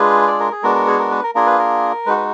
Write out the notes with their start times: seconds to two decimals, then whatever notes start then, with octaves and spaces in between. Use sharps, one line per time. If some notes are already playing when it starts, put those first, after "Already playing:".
Already playing: G#3 D4 F4 G#4 B4
0.27 D5
0.40 A#4
0.52 G#4
0.63 G#3 B3 D4 F#4 A#4
0.75 A#4
0.87 G#4
0.99 A#4
1.11 B4
1.23 A#4
1.35 A#3 D4 F4 G#4 A#4
1.47 B4
1.59 A#4
2.06 G#3 D#4 F#4 B4
2.17 B4